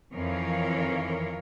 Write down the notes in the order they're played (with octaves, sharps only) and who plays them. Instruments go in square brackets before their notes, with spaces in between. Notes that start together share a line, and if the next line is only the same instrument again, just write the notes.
[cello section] F2 D#3 E3 A#4 C#5 F5